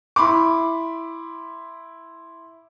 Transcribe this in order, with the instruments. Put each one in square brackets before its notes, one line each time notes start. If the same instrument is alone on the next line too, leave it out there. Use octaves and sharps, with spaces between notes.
[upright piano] E4 B5 C6 D6